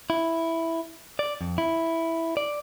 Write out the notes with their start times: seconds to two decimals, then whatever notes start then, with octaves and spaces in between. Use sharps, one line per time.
0.10 E4
1.19 D5
1.41 F2
1.58 E4
2.37 D5